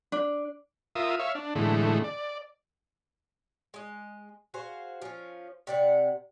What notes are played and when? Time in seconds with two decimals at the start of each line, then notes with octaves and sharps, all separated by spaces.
0.12 D4
0.96 F4 A#4 E5 D#6
1.19 C#5 E5 F5
1.35 D4
1.55 A2 D3 E3 G#3 A3
2.04 D5
3.74 G#3 D#5
4.54 F#4 G#4 C5 F5
5.02 F3 C#4
5.67 C3 D5 F#5